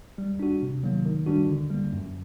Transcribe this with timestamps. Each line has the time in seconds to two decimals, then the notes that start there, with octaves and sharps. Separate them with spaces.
0.18 G3
0.40 D4 F#4
0.62 C3
0.83 D#3 F#3 A#3
1.05 D#3
1.27 G3 D4 F#4
1.49 D3
1.70 G3 A#3
1.92 F#2